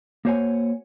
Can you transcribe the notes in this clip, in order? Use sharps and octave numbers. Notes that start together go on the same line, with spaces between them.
A#3 F#4 C5 C#5 F#5 G#5